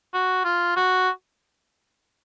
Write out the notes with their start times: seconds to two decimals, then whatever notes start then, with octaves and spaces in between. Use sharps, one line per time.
0.14 F#4
0.45 F4
0.76 F#4